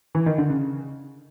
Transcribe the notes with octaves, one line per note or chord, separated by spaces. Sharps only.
E3
D#3
D3
C#3